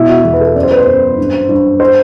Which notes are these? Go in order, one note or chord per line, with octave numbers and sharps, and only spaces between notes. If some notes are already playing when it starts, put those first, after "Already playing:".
Already playing: B2 E4
F#4
E2
B4
A4
F#2 D5
C5
B4
C5
F#2
G2
G2
C5